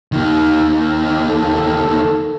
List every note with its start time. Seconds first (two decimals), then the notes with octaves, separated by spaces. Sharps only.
0.12 D#2 D#3
1.30 A4